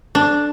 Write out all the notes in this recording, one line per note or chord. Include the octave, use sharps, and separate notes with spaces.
D4